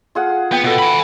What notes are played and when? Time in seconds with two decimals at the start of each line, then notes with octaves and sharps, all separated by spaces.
0.15 F4 G#4 F#5
0.52 B3 G5
0.64 B2 A4 F#5
0.79 G#5 B5